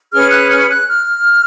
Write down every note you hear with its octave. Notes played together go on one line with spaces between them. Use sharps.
C#4 G#4 B4 F6
F#6
F6
F#6
F6